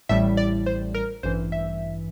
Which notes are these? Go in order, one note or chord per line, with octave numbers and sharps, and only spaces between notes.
A1 A2 G3 E5
D5
C5
A#4
A1 G2 E3 C5
E5